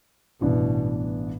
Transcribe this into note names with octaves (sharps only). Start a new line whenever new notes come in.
A1 G2 B2 E3 B3 D4